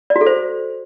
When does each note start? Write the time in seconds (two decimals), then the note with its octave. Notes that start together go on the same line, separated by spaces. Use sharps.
0.10 D5
0.16 F#4
0.21 A4
0.26 C5